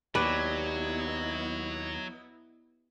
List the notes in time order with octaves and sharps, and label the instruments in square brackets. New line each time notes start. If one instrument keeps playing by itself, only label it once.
[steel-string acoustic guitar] D#2 [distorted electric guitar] F#3 [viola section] B3 E4 D#5 [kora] B4 D5